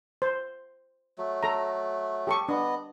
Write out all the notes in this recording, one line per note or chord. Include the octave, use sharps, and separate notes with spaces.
C5
F#3 A3
A4 A#5
G4 A4 C#6
B3 D4 D#5